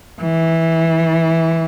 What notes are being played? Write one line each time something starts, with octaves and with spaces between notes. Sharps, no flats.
E3